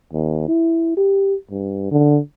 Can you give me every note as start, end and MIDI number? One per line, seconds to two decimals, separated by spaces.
0.13 0.45 39
0.48 0.96 64
0.97 1.34 67
1.51 1.89 43
1.91 2.19 50